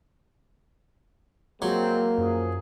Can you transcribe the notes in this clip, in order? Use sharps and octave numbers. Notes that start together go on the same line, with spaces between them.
F#3 G#3 A#3 C4
F#2 F3 G#4